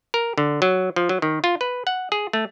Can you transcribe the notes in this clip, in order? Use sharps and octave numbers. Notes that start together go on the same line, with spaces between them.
A#4
D3
F#3
F3
F#3
D#3
F4
B4
F#5
G#4
A3